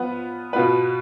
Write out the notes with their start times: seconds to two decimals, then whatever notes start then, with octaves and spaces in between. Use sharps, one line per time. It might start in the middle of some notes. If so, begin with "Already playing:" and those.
Already playing: F3 B3 F4 B4
0.53 B2 B3 F4 B4